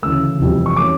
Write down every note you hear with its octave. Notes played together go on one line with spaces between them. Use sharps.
D2 C#3 E3 E6
F1 F2 E3 G3
C#6
E3 A3 C#4 D6